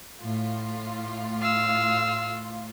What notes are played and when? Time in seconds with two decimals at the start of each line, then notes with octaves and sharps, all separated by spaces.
0.22 A2 F4
1.42 F5 E6